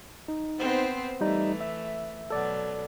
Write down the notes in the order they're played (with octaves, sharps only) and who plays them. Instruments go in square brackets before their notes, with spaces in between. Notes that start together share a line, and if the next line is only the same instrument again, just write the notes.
[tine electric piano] D#4
[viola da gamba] B3 C4 C5
[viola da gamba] E3 A3 [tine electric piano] G3 D#4
[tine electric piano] E5
[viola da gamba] B2 F#3 [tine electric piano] A4 D5